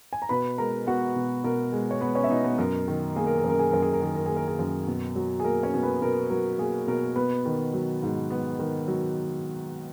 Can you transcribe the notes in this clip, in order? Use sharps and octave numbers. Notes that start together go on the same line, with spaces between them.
G#5
A#5
B2 B4 B5
G#3 A#4 A#5
B3 F#4 F#5
B2
B2 A#4
G#3
C#5
B3 B4
C#4 C#5
E5
B2 D#4 D#5
B3 B4
F#2 A#4
D#3
A#3 G#4
A#4
G#4
F#2
A#4
G#4
F#2 A#4
G#4
A#4
D#3 G#4
A#4
A#3 G#4
A#4
G#4
F#2
B2
F#3
G#4
A#3 A#4
C#4 C#5
B2
B3 B4
B2 A#4
F#3 A#4
A#3 G#4
B2 A#4
B3 B4
D#3
F#3
G#2
B3
D#3
F#3